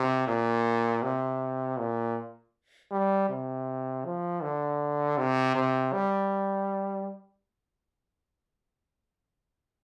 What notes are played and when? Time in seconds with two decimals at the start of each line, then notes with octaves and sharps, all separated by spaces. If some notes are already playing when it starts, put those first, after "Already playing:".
Already playing: C3
0.28 A#2
1.03 C3
1.79 A#2
2.92 G3
3.29 C3
4.05 F3
4.42 D3
5.18 C3
5.55 C3
5.93 G3